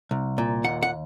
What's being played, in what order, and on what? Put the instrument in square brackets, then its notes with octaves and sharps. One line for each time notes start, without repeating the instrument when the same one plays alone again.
[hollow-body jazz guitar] C2
A#2
D#2 F#5
F#5